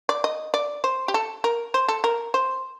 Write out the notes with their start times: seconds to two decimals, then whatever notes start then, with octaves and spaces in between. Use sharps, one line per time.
0.09 D5
0.24 D#5
0.54 D5
0.84 C5
1.08 G4
1.14 A4
1.44 A#4
1.74 C5
1.88 A4
2.04 A#4
2.34 C5